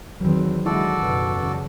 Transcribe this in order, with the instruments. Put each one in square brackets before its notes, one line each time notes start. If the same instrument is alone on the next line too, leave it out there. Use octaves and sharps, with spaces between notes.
[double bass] E2 C4 [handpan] D#3 F#3
[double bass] D3 G#3 [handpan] E4 [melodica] F#4 A4 D5
[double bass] F#1 B2
E2 C#3